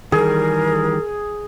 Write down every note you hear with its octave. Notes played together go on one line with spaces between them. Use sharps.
D#3 E3 G3 G#4 A#4